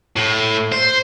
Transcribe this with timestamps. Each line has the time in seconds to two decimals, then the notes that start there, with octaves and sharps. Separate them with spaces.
0.16 A2
0.72 C5